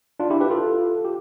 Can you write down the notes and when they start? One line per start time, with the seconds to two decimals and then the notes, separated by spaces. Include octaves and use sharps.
0.20 D4 F4
0.30 E4 G4
0.40 G4 B4
0.50 F4 A4
1.05 G4